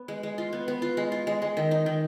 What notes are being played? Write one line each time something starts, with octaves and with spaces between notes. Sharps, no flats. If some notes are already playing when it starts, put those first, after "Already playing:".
Already playing: B3
G#3
G#3
F4
B3
B3
F4
G#3
F4
G#3
G#3
D#3
D#4
D#3